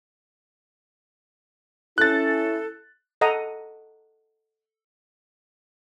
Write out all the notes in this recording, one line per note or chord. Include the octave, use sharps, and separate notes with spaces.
C#4 E4 A4 F#6 A6
A4 D#5 F#5 A#5 D#6